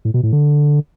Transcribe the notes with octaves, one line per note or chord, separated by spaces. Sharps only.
A2
B2
A2
D3